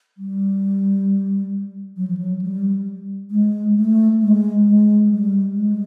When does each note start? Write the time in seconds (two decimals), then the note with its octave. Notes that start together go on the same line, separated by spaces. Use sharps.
0.18 G3
1.97 F#3
2.08 F3
2.17 F#3
2.42 G3
3.31 G#3
3.76 A3
4.20 G#3
4.65 G#3
5.10 G3
5.55 G#3